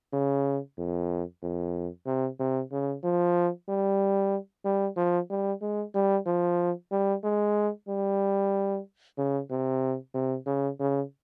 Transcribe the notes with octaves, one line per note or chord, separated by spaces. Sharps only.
C#3
F2
F2
C3
C3
C#3
F3
G3
G3
F3
G3
G#3
G3
F3
G3
G#3
G3
C#3
C3
C3
C#3
C#3